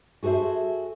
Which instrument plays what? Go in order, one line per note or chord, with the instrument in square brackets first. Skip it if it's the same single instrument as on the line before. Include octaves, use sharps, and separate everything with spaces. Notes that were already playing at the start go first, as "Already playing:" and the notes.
[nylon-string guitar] F#4 G#4 A4 C5 E5